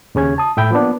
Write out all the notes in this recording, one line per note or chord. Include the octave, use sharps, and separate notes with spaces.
D#2 C#3 C#4 G#6
A5 D#6
A2 E5 G5 B5
F3 A#3 B3 D4